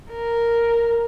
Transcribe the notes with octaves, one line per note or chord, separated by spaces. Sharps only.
A#4